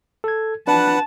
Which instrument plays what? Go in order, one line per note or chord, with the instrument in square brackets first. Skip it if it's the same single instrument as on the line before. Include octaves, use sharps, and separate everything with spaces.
[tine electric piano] A4 G#6
[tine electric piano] D4 [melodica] B4 F#5 [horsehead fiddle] A5